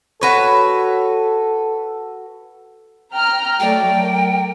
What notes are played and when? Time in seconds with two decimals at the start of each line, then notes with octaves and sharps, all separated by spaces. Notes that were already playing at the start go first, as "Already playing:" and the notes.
0.21 F#4 A4 B4 C#5
3.14 G5 A#5 F6
3.60 F#3 A3 D5 G5
4.01 A#4